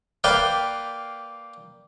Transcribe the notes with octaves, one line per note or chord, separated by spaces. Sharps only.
A#3 B4 D5 F5 G5